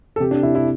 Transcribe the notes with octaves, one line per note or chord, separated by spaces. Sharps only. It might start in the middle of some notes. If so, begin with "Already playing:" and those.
A4
C3 G4
D4
C3 E4
E4